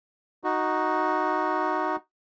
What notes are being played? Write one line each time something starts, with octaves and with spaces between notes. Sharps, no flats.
D#4 F#4